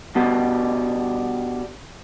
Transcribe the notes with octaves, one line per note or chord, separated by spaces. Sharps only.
G2 B2 G3